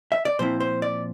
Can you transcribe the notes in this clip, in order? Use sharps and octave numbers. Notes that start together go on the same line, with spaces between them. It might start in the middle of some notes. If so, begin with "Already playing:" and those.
E5
D5
A#2 F3 C4 E4 C5
C5
D5